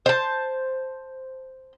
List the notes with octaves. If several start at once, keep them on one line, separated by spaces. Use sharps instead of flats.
C5 A5